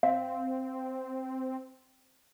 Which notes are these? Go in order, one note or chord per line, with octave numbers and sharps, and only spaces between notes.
C4 F5